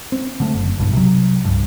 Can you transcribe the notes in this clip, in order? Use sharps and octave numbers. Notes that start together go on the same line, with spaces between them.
C4
D3 A3
F#1
B1 G2
C3 F#3
C2 G2